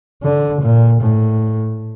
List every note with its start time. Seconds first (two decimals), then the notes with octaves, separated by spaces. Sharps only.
0.23 D3
0.62 A#2
1.01 A2